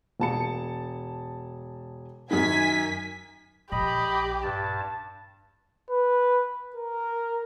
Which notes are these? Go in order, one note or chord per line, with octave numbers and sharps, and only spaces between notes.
E1 A5 C#7
F#2 D#3 G#5 B6
A#1 G4 D#5 B5
G2 A5
B4
A#4